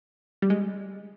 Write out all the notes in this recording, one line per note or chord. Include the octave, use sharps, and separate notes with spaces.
G3
G#3